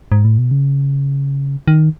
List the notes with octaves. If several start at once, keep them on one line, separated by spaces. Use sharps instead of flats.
G#2
A2
B2
C#3
D#3